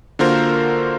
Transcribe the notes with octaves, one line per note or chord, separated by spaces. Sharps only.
D3 A#3 F4 F#4 A#4 C5